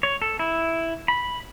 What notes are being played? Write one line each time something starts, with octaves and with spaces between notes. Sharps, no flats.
C#5
A4
E4
B5